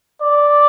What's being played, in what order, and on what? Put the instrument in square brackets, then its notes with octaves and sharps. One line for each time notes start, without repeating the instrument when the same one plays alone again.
[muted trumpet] D5